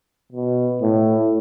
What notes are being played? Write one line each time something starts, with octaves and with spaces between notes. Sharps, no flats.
B2
A2